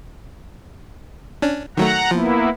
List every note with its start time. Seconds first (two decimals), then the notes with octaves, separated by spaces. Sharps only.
1.42 C#4 D4
1.77 D#3 F#3 A3 F#5 A#5
2.11 F3 A#3 B3 E4